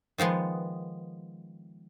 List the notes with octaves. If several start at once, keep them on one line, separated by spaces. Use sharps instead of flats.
D#3 F3 G#3 B3